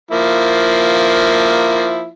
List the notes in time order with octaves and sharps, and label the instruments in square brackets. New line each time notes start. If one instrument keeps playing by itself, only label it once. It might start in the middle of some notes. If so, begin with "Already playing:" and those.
[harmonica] F3 A#3 E4